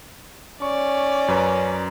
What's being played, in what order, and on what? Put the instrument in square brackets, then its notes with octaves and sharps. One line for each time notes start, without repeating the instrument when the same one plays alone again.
[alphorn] C#4 [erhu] D5 [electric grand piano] C#6
[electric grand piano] F#2 B4 A#5